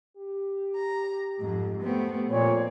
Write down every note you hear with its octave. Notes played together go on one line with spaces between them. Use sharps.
G4
A#5
F2 G#2
A3 B3 C4
F2 A#2 C4 C#5